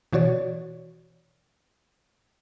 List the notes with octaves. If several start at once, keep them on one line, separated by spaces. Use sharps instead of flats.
B2 E3 F#4 C#5 D5